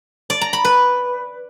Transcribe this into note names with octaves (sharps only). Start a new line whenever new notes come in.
D5
A#5
B5
B4